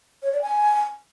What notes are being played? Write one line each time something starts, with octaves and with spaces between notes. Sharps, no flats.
C#5
D5
G#5